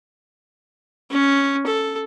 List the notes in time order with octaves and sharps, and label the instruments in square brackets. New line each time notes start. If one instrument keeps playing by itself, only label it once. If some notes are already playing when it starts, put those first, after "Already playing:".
[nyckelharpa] C#4
A4